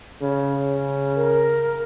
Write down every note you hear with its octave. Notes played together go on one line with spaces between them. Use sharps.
C#3
A#4